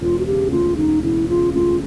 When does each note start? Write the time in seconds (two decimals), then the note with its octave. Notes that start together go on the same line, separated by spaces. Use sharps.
0.01 E1 F4
0.19 F#4
0.26 C#3 G4
0.51 D2 F4
0.77 E1 D#4
1.03 E1 E4
1.29 C#3 F4
1.54 D2 F4